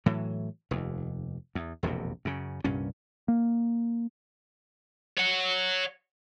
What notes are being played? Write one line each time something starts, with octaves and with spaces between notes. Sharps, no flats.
A2 E3 F#3
F1 D#2
E2
E1 A#1 F2 C3
F#2 C#3
C2 G2 A#2 C#4
A#3
C#5 F#5